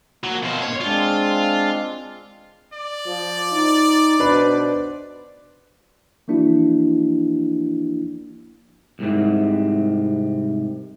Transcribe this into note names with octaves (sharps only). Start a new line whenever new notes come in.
F3 F#3 A#3
B2 C4 C5 F5
G2 A#2 A#3 C#5
G#3 C4 D4 F4
D5
F3
D#4
B2 D4 B4 C5
E3 F3 A#3 D4 E4 F#4
C2 G#2 C3